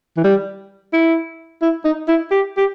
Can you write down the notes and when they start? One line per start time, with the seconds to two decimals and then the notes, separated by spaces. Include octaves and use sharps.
0.17 E3
0.24 G3
0.93 E4
1.62 E4
1.85 D#4
2.08 E4
2.31 G4
2.57 G4